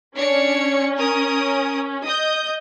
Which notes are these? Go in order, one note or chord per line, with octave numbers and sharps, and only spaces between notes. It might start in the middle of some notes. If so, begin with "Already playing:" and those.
C#4 D4 C#5 C#7
A#4 D#6
D#5 D#6 G6